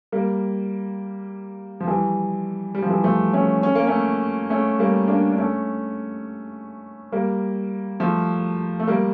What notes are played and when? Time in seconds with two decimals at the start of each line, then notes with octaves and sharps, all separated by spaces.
0.12 G3 A#3
1.80 F3
1.87 E3 G3
2.75 G3
2.82 F3
2.90 E3 G3
3.04 F3 A3
3.33 A3 C#4
3.63 C#4
3.75 A#3
3.87 A3 C#4
4.50 A3 C#4
4.79 G3 A#3
5.08 A#3 D4
5.32 D4
5.38 A3 C#4
7.12 G3 A#3
8.00 F3 A3
8.79 A3
8.87 G3 A#3